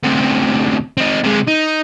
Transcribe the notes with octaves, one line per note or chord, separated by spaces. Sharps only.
D2 C3
C4 D#4
C3 G#3
D#4